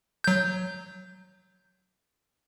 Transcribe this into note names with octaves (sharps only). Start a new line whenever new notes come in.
F#3 G6